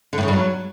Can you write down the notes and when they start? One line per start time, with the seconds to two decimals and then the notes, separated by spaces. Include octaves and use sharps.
0.13 D3
0.18 A2
0.23 C#3
0.28 G2
0.33 F#3